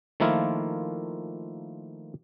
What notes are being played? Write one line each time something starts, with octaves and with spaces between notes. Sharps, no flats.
D#3 F3 A3 A#3 E4 F4